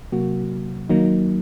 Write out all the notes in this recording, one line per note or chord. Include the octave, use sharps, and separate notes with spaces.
C3 F#3 A#3 F#4
D#3 F#3 A#3 D#4